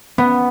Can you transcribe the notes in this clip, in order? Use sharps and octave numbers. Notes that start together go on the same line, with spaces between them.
B3